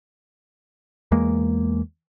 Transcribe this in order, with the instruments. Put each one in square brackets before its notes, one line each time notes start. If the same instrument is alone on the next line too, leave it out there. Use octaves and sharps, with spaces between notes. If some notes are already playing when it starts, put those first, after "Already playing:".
[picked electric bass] E2 G#3 A#3